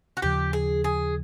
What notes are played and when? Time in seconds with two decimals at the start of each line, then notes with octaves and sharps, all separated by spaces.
0.17 F#4
0.22 D#2 C#3 F3 G4
0.53 G#4
0.84 G#4